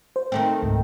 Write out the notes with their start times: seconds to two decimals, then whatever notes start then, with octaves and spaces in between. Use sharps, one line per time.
0.16 C5
0.32 D#3 A3 C4
0.63 C#2 G#2